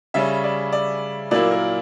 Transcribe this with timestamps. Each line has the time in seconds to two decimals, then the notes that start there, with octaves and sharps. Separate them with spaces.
0.14 C#3 G3 C#4 E5
0.44 D5
0.73 D5
1.31 A#2 F#3 A#3 E4 D5
1.51 A#4